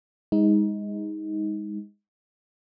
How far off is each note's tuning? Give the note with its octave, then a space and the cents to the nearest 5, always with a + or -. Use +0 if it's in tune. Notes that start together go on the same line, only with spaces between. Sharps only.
G#3 -25 D#4 +20